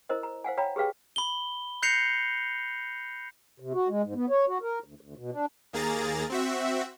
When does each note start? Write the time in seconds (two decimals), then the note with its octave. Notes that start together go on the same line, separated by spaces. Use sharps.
0.09 E4 A#4 C5 D#5
0.23 A#5
0.44 C5 F5 F#5 G#5
0.57 C#5 F5 G5 A#5 B5
0.76 G4 G#4 B4 F5 G5
1.16 B5 G7
1.82 F#6 G6 A#6 C7 C#7 F7
3.60 C3
3.74 F#4
3.88 G#3
4.03 G#2
4.15 B3
4.30 C#5
4.48 F#4
4.62 A#4
4.84 D2
5.01 D2
5.17 B2
5.32 D4
5.73 D#2 A#3 G#4 A#5 A6
6.30 C4 F#4 E5